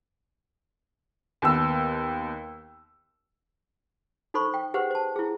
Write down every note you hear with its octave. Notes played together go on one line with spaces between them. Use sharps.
D#2 B3 E6
D#4 A4 C5 B5 C#6
G5
G4 G#4 B4 C5 F#5
C5 A5
E4 G#4